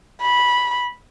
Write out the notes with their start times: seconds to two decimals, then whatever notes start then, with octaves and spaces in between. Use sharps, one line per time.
0.22 B5